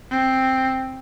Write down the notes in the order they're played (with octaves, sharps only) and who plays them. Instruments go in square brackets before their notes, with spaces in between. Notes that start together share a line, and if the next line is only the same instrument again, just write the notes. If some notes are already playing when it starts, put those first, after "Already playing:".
[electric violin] C4